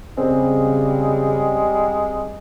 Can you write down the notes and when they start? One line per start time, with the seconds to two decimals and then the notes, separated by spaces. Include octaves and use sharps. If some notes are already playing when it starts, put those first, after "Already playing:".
0.17 C#3 G3 G#3 C4 G#4